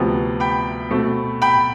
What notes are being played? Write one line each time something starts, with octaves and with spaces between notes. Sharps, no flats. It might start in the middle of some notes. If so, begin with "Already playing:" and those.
Already playing: D2 C3 F3 B3
G5 B5
B2 A3 C4
G5 B5